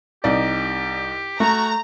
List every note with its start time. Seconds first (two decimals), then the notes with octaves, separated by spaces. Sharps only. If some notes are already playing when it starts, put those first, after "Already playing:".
0.24 C2 D#4 G4 D5
1.40 A3 F#4 A#5